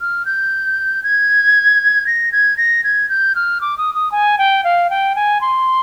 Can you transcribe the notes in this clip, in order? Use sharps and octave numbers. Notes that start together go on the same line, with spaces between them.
F6
G6
G#6
A#6
G#6
A#6
G#6
G6
F6
D6
D#6
D#6
G#5
G5
F5
G5
G#5
C6